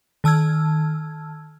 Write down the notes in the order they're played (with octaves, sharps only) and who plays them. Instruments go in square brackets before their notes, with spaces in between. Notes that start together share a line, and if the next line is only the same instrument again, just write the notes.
[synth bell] D#3 A5 E6 F6 G#6